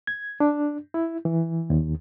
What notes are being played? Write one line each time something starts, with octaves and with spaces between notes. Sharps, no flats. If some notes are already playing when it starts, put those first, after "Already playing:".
G#6
D4
E4
E3
D#2